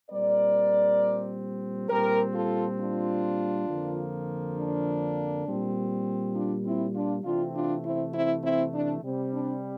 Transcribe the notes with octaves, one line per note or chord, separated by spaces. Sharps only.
A#2 G3 C4 A#4 D5
A#2 G3 C4 G4 A#4
F4 A4
D4 F4
F2 D3 F3 A#3
D4
A#2 G3 C4
D4 F4
C4 E4
D4 F4
C3 E3 A3 C4 D4 F4
D4 F4
C4 E4
C4 E4
C4 E4
D4
C3 G3 C4
D4